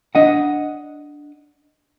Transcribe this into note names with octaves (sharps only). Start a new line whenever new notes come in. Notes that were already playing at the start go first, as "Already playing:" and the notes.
D4 D#5 F#5